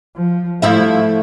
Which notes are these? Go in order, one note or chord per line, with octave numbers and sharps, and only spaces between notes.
F3
F3 A3 E4 E5